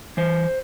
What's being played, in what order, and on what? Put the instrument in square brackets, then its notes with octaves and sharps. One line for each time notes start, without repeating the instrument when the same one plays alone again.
[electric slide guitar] E3 C5